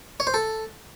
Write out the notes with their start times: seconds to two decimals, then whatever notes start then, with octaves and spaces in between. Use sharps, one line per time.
0.20 C#5
0.27 C5
0.34 A4